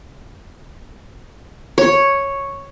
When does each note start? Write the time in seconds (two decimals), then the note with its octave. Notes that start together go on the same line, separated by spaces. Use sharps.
1.78 C#5